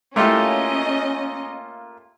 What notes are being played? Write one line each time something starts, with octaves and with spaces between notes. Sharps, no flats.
A3 A#3 C#4 E4 F4 G4 A4 D#5